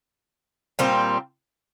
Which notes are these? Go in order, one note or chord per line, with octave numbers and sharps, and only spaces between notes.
A#2 G3 C4 F4